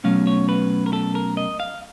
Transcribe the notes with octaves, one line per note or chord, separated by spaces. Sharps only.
B2 F#3 A3 C#4 F5
C#5
B4
A#4
A4
A#4
D#5
F5